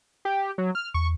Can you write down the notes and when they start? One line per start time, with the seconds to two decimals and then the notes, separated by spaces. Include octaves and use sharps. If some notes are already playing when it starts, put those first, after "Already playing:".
0.25 G4
0.58 F#3
0.75 F6
0.94 E2 C#6